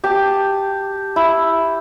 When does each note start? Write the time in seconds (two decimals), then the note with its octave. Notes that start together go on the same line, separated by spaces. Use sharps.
0.04 G4 A5
1.16 E4